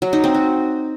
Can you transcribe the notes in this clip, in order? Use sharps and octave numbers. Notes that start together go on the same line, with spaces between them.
F#3
D#4
C4
F#4